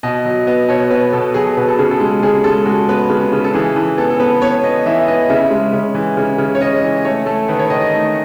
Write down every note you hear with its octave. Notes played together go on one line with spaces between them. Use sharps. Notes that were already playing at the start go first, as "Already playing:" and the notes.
B2 D#5
F#3 D#5
B3 D#5
B2 C#5
B2 B4
B2 A4
F#3 G#4
B2 B4
A4
C#3 G#4
A4
G#3
C#3 G#4
G#3 A4
G#3 F#4
B3 B4
C#3
C#3
A4
E3 G#4
E3
B3 A4
A4
B3 B4
B3 C#5
B3 D#5
E3 E5
B3 D#5
C#3 E5
G#3
C#3
E3
C#3
C#3
C#5
C#3 D#5
E3
A3 C#5
A3 A4
D#3 B4
C#5
D#3 D#5
D#5
A3